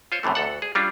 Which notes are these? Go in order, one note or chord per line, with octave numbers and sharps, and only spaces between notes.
F4 C5 C#5
F#2 A2 C3 E3 A3
D2 A4 F#5
G#4
G3 C#4 D4 F4